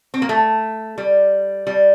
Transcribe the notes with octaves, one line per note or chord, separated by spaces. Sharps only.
C4
A#3
A3
G3
G3